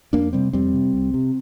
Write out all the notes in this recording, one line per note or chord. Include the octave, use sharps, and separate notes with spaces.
F2 A#3 D4
C3 G3 C4
F2 G3 C4
C3
C2
C3